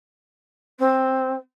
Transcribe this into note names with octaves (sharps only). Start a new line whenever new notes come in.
C4